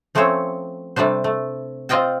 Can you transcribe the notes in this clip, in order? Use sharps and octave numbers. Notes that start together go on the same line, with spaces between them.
F3 A3 C4 C#4 C5 C#5
C3 G3 A3 D4 C5
A3
C4 F4 D#5 G5 A5